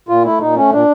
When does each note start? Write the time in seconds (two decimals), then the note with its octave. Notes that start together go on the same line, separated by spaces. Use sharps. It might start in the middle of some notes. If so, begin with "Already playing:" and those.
0.09 A#2 F4
0.24 A3 E4
0.40 A#2 D#4
0.56 A3 C#4
0.72 A#2 D4